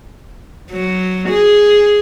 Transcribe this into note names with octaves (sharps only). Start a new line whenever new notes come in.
F#3
G#4